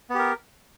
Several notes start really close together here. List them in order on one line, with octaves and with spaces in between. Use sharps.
B3 G4 A#4